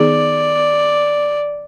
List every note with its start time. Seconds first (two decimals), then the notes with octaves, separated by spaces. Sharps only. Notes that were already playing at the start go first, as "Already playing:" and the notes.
Already playing: D#3 B3 D#4 G#4 D5